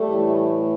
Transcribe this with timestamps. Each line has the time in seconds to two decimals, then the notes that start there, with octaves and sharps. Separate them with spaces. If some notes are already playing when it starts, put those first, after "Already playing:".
Already playing: G3 A3
0.10 A2 E3